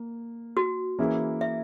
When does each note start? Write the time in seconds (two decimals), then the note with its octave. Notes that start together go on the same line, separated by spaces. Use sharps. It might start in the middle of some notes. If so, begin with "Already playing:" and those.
Already playing: A#3
0.57 F#4
0.99 E3 A#3 C#4 E4 G#4
1.41 E5